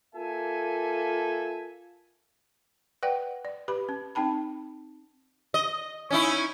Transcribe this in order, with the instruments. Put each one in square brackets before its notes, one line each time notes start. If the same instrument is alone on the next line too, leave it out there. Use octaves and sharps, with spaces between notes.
[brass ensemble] A#3 F4 A4 E5 G#5
[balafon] B4 D5 F#5 G5
D5
G4 B4 B5
C#4
C4 D#4 G5 A5 B5
[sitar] D#5
C#4 D#4 E4